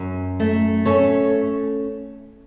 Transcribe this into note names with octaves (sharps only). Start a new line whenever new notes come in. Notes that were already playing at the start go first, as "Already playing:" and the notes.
Already playing: F#2
A3
C#4 A4 C#5